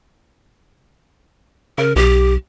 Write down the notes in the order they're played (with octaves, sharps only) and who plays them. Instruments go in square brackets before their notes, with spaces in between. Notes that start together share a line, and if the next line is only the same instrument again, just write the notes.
[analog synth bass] C#3 [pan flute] A#4
[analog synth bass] B1 [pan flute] G4